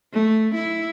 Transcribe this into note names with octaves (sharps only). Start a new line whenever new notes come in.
A3
E4